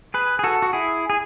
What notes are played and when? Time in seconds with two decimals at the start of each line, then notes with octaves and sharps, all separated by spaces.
0.14 G#4 B4
0.39 G#4
0.43 F#4 A4
0.62 F#4
0.73 E4 G#4
1.10 G#4